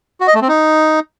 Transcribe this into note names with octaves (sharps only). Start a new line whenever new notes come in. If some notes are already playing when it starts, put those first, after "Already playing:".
F#4
D#5
A3
C4
D#4